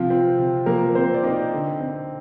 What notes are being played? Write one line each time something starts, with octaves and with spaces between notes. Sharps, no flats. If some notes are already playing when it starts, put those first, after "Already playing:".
Already playing: C3 F3 F4
C4
C3
F3 A#3 A#4
C3 C4 C5
D5
C4 D#4 D#5
D3
C4